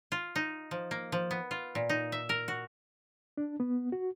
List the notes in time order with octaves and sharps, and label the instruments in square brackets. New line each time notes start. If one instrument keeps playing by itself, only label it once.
[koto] F4
D#4
F3
A#3
F3
B3
F4
A#2
D#4
E5
A#4
F#4
[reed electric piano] D4
B3
F#4